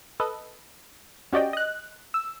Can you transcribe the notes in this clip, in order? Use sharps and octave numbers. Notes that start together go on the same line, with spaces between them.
A4 B4 D#5
C#4 F#4 G4 D5 D#5 G5
D#5 F#6
E6